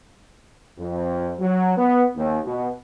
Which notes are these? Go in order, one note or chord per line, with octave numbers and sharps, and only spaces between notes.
F2
F#3
B3
D#2
B2